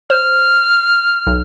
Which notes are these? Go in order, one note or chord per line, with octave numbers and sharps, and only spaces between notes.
C5 F6
B1